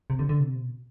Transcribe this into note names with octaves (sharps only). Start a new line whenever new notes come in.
C3
D3
D3
C3
B2